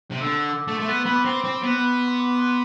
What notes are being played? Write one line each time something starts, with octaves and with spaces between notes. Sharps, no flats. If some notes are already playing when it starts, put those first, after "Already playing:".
C3
D3 E6
D6
A3
A3 C6
B3
B3 B5
D6
C4 C6
C4 D6
B3
C6
D6
C6